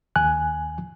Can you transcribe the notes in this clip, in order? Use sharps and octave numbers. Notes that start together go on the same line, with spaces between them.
D#2 G#5 F#6